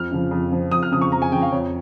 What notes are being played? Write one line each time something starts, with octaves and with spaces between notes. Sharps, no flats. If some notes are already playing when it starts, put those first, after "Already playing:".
Already playing: F2 F6
C#3 F3
F2
C#3 F3
F2 D#6
F6
C#3 F3 D#6
C#6
F2 A#5
G#5
C#3 F3 G5
F5
F2 C#5